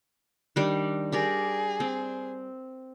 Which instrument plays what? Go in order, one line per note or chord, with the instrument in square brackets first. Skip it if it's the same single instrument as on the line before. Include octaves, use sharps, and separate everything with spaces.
[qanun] D#3 G3 D4
[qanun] G4 A#4 D5 [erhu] G#4
[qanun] C4